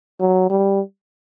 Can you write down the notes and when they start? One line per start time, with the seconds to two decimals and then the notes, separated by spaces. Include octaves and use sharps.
0.20 F#3
0.50 G3